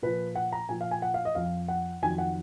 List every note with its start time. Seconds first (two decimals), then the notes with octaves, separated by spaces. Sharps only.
0.02 A#2 F3 B4
0.35 F#5
0.52 A#5
0.69 A#2 F3 G#5
0.81 F5
0.91 G#5
1.02 F#5
1.14 F5
1.25 D#5
1.35 F2 F3 F5
1.68 F#5
2.02 F2 D#3 F#3 G#5
2.18 F#5